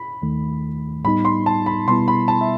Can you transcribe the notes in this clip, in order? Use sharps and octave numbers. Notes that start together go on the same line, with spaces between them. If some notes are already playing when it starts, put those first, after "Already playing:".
Already playing: B5
D#2 D#3 A3
A2 G3 B3 D#4 B5
C6
A5
B5
B2 G3 B3 E4 C6
B5
A5
E5